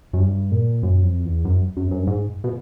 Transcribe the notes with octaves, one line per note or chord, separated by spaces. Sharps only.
F#2
G2
A#2
F#2
F2
E2
F#2
F#2
F#2
G2
G#2
B2